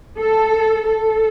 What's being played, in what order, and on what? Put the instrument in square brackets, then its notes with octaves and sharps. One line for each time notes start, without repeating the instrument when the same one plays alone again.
[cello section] A4
A4